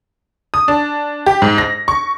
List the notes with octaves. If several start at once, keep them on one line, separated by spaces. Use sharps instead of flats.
D#6
D4
G4
G#2
A#6
C#6